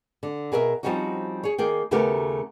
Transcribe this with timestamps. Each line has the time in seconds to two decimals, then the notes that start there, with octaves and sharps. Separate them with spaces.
0.23 D3
0.52 B2 G#4 A#4 D5 E5
0.83 F3 G3 C4 C#4 D#4 F#4
1.43 G#4 C#5
1.58 D#3 A#3 G#4 G5
1.91 D#2 C#3 A3 B3 G4 A#4